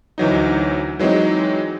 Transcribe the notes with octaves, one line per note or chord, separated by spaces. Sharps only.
D2 E3 F#3 D#4
E3 F#3 G#3 C4 D#4